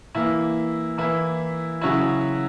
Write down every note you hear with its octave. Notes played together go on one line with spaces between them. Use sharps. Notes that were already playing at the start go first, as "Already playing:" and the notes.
E3 A#3 E4
E3 A#3 E4
C#3 F#3 C#4 E4